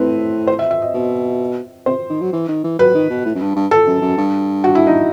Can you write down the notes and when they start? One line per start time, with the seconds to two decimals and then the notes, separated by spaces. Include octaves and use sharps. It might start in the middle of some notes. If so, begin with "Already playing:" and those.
Already playing: A2 C4 B4
0.47 C5
0.59 E5
0.71 E5
0.82 D#5
0.94 B2
1.86 C3 C5
2.10 D#3
2.21 F#3
2.33 E3
2.48 D#3
2.64 E3
2.79 F#3 B4
2.95 D#3
3.10 B2
3.25 A2
3.35 F#2
3.41 G2
3.55 G2
3.71 A4
3.87 F#2
4.02 F#2
4.17 G2
4.64 F#4
4.75 E4
4.87 D#4